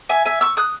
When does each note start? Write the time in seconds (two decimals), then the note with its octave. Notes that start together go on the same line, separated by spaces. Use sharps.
0.09 E5 G#5
0.25 E5 G#5
0.41 C#6 E6
0.57 D#6 F#6